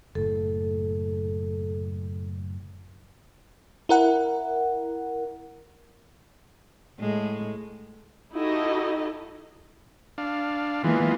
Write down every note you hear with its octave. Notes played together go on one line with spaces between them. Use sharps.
F#1 A2 A4
E4 A#4 F#5
A2 G#3
D#4 E4 F#4 G4 A4 D#5
D4 F5
E3 G#3 A#3 B3 F4